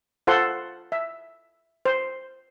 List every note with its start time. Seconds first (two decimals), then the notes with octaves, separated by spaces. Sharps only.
0.27 F4 A4 C5 F#5 C6
0.92 E5
1.85 C5